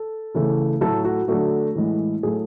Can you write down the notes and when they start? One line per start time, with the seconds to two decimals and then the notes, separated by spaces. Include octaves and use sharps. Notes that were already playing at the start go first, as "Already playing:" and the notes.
Already playing: A4
0.35 C#3 E3 A3
0.81 A2 F#3 A3 A4
1.05 F#4
1.28 D3 F#3 A3 F#4
1.75 A2 E3 G#3
2.23 A2 F#3 A3 G#4